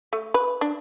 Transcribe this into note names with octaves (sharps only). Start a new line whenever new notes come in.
A3
B4
D4